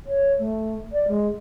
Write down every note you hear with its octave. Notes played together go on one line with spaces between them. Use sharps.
C#5
A3
D5
G#3